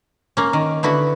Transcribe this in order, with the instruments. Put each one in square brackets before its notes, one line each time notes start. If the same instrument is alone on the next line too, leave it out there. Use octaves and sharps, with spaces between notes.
[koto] A#3 C#4
D#3
D3 B3 E4 F#4